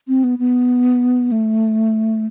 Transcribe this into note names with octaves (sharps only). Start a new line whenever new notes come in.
C4
B3
B3
A3